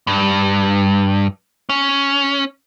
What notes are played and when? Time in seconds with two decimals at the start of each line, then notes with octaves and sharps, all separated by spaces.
0.07 G2
1.69 C#4